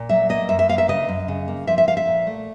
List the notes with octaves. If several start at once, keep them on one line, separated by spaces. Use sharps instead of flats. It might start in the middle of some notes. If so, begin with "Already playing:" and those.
Already playing: A#2
F#3 E5
A#3 D#5
F#2 E5
E5
A#3 F5
E5
C#3 D#5
F#2
C#3
A#3
F3 E5
E5
F3 F5
E5
A#2
A3